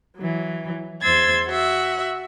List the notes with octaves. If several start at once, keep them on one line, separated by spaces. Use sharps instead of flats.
E3 F#3
E2 C5 C6 E6 G#6 A6
F#4 E5